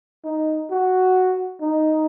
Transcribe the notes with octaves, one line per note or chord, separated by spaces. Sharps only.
D#4
F#4
D#4